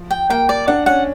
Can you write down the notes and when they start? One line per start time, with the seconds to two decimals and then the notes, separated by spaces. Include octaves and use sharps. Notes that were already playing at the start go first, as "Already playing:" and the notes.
Already playing: F3
0.11 G5
0.30 A#3 G5
0.49 D5
0.67 D4 F#5
0.86 C#4 F#5